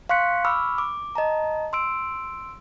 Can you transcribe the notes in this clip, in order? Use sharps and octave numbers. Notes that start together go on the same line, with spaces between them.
F5 C6 C#6 F#6 B6 C#7
B5 C#6 D6 E6 F6
D6
D#5 A5 A#5
C6 E6 D7